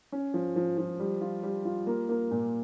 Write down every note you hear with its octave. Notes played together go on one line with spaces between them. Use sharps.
C#4
F3
F3
F3
G3
F4
G3
F4
A#3
A#3
A#2